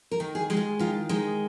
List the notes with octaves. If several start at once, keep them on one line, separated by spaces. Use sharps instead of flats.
A#4
D#3
G#4
G#3 G#4
F4
D#3 F4
G#3 D#4